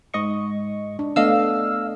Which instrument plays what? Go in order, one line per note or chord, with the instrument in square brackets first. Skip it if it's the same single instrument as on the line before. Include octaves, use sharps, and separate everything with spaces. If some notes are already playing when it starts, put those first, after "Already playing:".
[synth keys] G#2 D#5 C#6
[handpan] D4
[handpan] A3 B3 D4 [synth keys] D#5 F5 E6